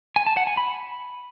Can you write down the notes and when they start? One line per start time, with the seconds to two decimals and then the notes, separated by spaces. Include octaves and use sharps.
0.16 G#5
0.26 A5
0.37 F#5
0.47 G#5
0.57 B5